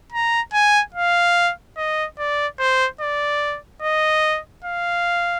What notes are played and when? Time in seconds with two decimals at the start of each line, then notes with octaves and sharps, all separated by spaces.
0.12 A#5
0.53 G#5
0.95 F5
1.77 D#5
2.18 D5
2.59 C5
3.01 D5
3.82 D#5
4.64 F5